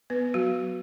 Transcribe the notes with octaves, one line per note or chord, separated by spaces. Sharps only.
B3 B4
F#3 F#4